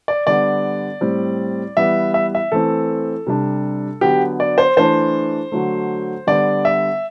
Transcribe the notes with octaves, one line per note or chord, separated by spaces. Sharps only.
D5
D3 G3 B3 D5
A2 G3 C4
E3 G3 B3 E5
E5
E5
E3 A3 C4 A4
C3 G3 D4
D3 F#3 B3 G4
D5
C5
E3 A3 D4 C5
D3 F#3 A3
D3 G3 B3 D5
E5